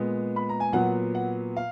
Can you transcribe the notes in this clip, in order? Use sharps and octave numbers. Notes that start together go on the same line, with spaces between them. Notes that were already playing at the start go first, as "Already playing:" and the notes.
Already playing: A#2 G#3 B3
B5
A#5
G#5
A#2 F#3 B3 F#5
F#5
F5